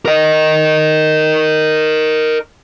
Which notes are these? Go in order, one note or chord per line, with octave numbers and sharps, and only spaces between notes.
A#4 D#5